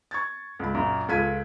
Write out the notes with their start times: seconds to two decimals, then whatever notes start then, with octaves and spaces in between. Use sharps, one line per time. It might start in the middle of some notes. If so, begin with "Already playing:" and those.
0.11 C#6 G#6 A6
0.59 C#2 B5
0.74 F#2 A#2 A#3
1.08 C#2 F4 A4 G#6 B6 D#7